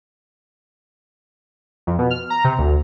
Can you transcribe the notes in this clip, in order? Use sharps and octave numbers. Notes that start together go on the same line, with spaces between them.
F2
B2
F6
A#5
C3
D2